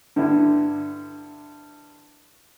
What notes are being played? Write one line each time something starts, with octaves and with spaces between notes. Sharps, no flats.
G2 D3 E4